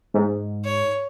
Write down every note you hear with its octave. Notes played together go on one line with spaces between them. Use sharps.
G#2
C#5